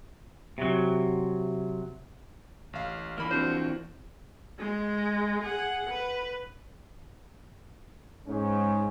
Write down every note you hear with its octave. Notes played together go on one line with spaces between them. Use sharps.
C3 F#3
A1 F5
E3 F3 A#3 B5 F6
C4 D4 F#4 C5
G#3
G#4 F#5
B4
G#2 C#4